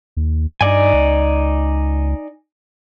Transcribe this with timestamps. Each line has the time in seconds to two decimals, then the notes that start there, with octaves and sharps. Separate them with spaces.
0.17 D#2
0.61 G2 D#4 D5 G#5
0.94 C#2